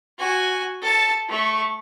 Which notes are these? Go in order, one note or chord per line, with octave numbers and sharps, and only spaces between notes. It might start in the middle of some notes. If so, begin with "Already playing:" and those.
F#4 G#5
A4 A5
A3 C#6